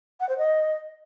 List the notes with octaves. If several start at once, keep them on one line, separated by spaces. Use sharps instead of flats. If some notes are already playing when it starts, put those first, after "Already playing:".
F#5
C5
D#5